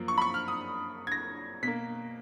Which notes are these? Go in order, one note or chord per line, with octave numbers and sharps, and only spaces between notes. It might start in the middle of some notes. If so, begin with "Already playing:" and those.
Already playing: F#2 F3 A#3
C#6
B5
C#6
F6
D#6
G#6
A#6
B2 A#3 B6